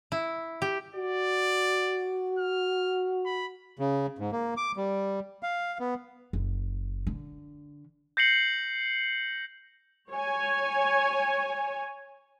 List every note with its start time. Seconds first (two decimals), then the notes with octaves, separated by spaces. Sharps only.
0.12 E4
0.62 G4
0.95 F#4 D5
2.39 F6
3.26 B5
3.79 C#3
4.19 G#2
4.32 A#3
4.57 D6
4.77 G3
5.43 F5
5.80 B3
6.33 F#1
7.07 D3
8.17 G6 A#6 C7 C#7 F#7
10.11 C#5 G#5